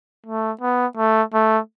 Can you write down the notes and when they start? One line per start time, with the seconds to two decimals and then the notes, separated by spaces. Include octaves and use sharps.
0.26 A3
0.61 B3
0.97 A3
1.33 A3